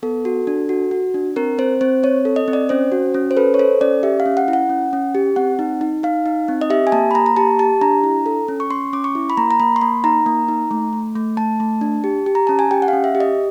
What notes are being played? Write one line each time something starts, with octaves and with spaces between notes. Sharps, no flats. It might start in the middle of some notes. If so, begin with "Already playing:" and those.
B3 A4
F#4
D4
F#4
F#4
D4
C4 A#4
C4 C5
C4 C5
C4 C#5
A4
D#5
C4
D5
C#4 C5
F#4
C#4
C5
A4 B4
C#5
A4 C5
C#4 D5
G4 E5
F5
C#4
F#5
E4
F#5
C#4
C#4
G4
C4 F#5
D#4
D#4
D#4 F5
D#4
C4
D#5
G4 E5
G#5
A#3 A5
B5
A#3 A#5
A#5
G4 A5
G4 A5
D4 A#5
E4
A4
C#4
C#6
C#4 C6
C#4 D6
C#6
E4
B5
A#3 A#5
A#5
A#3 B5
C6
A#3 B5
D#4 A#5
A#3
D#4
A3
A3
A3
A3 A5
A3
D4
G4
G4
A#5
C#4 A5
G#5
G4 G5
F#5
C#4 F5
E5
G4
D#5